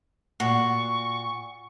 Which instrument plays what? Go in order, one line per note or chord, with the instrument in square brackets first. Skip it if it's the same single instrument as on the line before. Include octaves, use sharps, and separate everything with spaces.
[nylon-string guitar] A#2 [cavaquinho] F#4 [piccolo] C#6